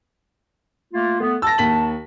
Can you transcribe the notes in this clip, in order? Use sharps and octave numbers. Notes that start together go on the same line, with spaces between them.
A3 A#3 F4
A3 B3
A5 E6 A#6
D#2 B6 F#7